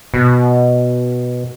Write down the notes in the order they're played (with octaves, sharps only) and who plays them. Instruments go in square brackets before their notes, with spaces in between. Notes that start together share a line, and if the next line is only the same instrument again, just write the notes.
[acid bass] B2